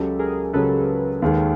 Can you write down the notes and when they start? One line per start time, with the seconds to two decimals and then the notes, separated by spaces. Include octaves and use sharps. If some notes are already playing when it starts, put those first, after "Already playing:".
Already playing: C#2 C#3 F#3 G4 A4
0.19 G#4 A#4
0.53 C#2 C#3 F#3 A4 B4
1.22 D#2 D#3 G#3